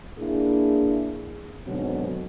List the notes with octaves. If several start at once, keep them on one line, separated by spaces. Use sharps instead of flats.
A#3 D4 E4 G#4
G#2 B2 D3 F#3 C4